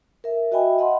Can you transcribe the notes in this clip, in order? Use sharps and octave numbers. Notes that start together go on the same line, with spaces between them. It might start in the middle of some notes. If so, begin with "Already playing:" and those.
A#4 E5
F#4 D#5 E5 G5 G#5 B5
D#5 F#5 B5 C6